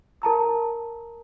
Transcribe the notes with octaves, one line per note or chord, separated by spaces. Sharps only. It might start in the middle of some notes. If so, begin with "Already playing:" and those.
A#4 A5 A#5 E6